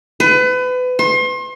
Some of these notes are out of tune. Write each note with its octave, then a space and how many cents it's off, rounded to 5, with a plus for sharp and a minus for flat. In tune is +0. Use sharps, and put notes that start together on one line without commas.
B4 +30
C6 +35